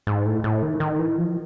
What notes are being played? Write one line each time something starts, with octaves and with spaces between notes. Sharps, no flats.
G#2
A2
A2
D#3
D#3
E3
F3